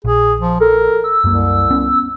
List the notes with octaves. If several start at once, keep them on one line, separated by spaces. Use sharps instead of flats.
A#1 G#4
F3
A4 A#4
E6
C2 F#2 A#3
B3 C#4